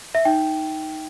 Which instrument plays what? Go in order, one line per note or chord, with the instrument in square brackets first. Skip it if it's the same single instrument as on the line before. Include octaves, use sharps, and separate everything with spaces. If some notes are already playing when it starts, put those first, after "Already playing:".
[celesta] E5
D#4 G5